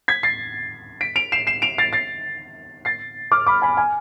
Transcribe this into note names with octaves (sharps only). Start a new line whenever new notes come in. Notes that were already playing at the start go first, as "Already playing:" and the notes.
G#6 B6
A6 C7
B6 D7
D7 F7
C7 E7
C7 E7
D7 F7
A6 C7
A6 C7
A6 C7
D6 F6
B5 D6
G#5 B5
G#5